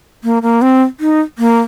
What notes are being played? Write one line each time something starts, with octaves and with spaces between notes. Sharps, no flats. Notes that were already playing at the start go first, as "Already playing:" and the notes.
A#3
A#3
C4
D#4
A#3